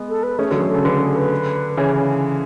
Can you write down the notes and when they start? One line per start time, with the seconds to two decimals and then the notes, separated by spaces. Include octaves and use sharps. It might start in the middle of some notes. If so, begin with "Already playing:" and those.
Already playing: G#3 B3
0.09 A4
0.23 B4
0.39 A3 C#4 G#4
0.50 D3 F#3
0.55 G#4
0.62 D3
0.70 C#3 A4
0.85 D3 B4
1.01 G#4
1.16 B4
1.77 C#3 E3 C#5